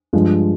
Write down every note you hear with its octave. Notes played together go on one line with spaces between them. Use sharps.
G2 F3 G#3